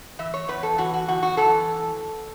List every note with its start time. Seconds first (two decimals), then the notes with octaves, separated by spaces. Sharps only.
0.19 E3 E5
0.34 C#5
0.48 E2 B4
0.63 A4
0.78 E3 F#4
0.94 F#4
1.08 E2 F#4
1.23 F#4
1.37 E3 A4